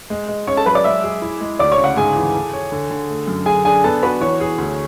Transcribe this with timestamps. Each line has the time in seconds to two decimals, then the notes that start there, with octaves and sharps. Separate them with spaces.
0.10 G#3
0.28 G#3
0.47 C#4 C#5 C#6
0.57 A4 A5
0.66 F#3 B4 B5
0.75 D5 D6
0.84 G#3 E5 E6
1.04 G#4
1.22 E4
1.41 G#3
1.59 D2 D5 D6
1.72 C#5 C#6
1.78 C#3
1.84 F#5
1.96 G#2 G#4 G#5
2.16 E3
2.35 A4
2.53 C#5
2.72 D3
2.91 D3
3.09 A3
3.27 F#2
3.46 D3 G#4 G#5
3.65 D4 G#4 G#5
3.84 B3 A4 A5
4.03 F#4 B4 B5
4.21 E3 C#5 C#6
4.40 G#4
4.58 D2